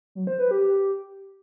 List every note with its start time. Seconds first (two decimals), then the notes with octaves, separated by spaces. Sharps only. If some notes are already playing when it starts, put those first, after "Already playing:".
0.15 F#3
0.27 C5
0.39 B4
0.51 G4